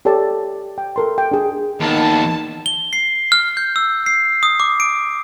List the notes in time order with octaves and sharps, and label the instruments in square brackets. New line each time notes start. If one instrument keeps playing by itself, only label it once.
[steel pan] G4 A4 C#5 D5 A5
G5
A4 A#4 C6
G5
D4 G#4
[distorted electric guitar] D#2 B3 [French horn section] D#3 D#4 [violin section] A5
[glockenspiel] G7
C7
F6
G6
E6
C7
D#6
D6
D7